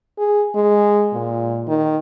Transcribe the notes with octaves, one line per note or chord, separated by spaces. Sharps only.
G#4
G#3
A#2
D#3